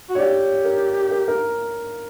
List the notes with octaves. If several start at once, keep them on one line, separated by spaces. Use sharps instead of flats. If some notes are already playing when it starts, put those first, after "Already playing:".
F#4
C#5
G4 D5
A#4
A#4
A#4